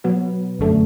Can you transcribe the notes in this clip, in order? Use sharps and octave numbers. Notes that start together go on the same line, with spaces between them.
B2 F#3 B3
G1 F#2 D3 A3